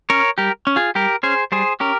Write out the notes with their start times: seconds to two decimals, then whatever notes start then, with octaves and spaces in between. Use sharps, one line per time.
0.10 C#4 A#4 C#5
0.38 G3 G4 A#4
0.67 C#4
0.76 F4 G#4
0.95 G3 G4 A#4
1.23 C#4 G#4 C5
1.52 G3 G#4 C5
1.80 C#4 G4 A#4